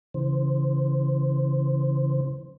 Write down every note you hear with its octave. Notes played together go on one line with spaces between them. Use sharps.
C#3 E3 C5